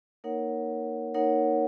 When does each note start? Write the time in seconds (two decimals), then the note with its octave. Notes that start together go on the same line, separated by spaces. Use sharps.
0.24 A#3 D#4 A#4 C#5 F#5
1.14 A#3 D#4 A#4 C#5 F#5